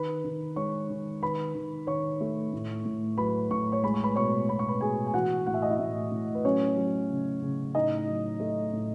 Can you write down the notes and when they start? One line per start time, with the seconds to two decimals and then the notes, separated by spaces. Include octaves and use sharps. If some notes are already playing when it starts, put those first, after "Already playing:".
Already playing: D#3 B4 B5
0.24 D#3
0.56 G#3 C#5 C#6
0.90 D#3
1.23 D#3 B4 B5
1.55 D#3
1.87 D#3 C#5 C#6
2.21 A3
2.53 A2
2.85 A2
3.18 F#3 B4 B5
3.50 A2 C#6
3.72 C#5 C#6
3.83 G#3 B5
3.94 C#6
4.04 B4 B5
4.15 B2 C#5 C#6
4.49 B2 B5
4.59 C#6
4.68 B4 B5
4.81 B2 G#4 G#5
5.07 G#5
5.14 E3 F#4 F#5
5.46 A2 F#5
5.54 E5
5.62 D#5
5.69 E4 E5
5.79 A2
6.11 A2
6.35 B4
6.45 F#3 C#4 C#5
6.77 F#3
7.09 C#3
7.42 C#3
7.75 A2 D#4 D#5
8.07 F#3
8.40 A3
8.73 A2